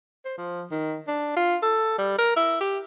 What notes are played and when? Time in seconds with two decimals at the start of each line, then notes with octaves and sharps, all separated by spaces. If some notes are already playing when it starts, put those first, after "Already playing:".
0.25 C5
0.38 F3
0.71 D#3
1.07 D4
1.36 F4
1.62 A4
1.99 G3
2.19 A#4
2.36 E4
2.61 G4